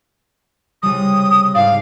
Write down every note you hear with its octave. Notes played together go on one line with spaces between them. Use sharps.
C2 C#3 G3 D#6
G#2 D5 F5